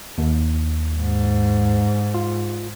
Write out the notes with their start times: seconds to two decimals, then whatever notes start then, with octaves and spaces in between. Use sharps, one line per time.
0.18 D#2
0.99 G#2
2.14 F4